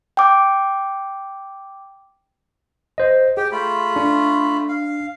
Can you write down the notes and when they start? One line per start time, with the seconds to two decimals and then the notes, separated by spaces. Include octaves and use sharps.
0.17 G5 D6
2.98 C5 D#5
3.37 G4 G#4 G5
3.52 A3 F4 B5
3.96 D4
4.69 F5